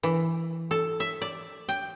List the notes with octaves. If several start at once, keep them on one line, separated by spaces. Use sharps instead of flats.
E3
A4
E5
D5
G5